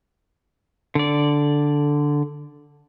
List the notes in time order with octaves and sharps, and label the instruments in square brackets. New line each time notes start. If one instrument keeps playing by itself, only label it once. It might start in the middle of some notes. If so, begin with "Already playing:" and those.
[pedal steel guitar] D3 D5